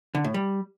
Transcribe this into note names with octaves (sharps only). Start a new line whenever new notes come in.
D3
A2
G3